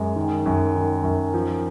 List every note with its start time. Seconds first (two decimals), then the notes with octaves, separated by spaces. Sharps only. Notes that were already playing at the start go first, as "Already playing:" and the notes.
Already playing: F#2 G#3
0.16 D#3
0.46 F#2
0.75 D#3
1.04 F#2
1.34 F3